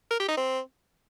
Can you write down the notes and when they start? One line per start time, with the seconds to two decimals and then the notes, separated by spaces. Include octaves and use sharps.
0.11 A#4
0.20 G4
0.28 D#4
0.37 C4